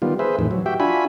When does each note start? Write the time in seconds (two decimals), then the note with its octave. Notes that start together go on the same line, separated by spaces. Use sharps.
0.02 D#3 G3 B3 F4
0.19 G#4 B4 C5 E5
0.39 F2 A2 D#3 E3
0.51 F#3
0.66 F#4 G4 E5 G5
0.80 D4 F4 F#4 E5 G#5 B5